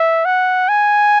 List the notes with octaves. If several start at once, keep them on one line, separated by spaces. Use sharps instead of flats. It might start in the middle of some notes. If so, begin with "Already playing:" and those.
Already playing: E5
F#5
G#5